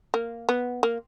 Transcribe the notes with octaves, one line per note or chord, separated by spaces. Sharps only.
A#3
B3
A#3